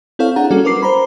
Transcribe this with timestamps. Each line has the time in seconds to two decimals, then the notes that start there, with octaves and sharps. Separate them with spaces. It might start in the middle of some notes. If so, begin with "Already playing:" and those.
0.19 C4 E4 A4 C#5 F5
0.36 D4 G#4 F#5 A#5
0.51 G3 A#3 C#4 F#4 A4
0.65 A#4 B4 D6 C7
0.83 C5 A#5 B5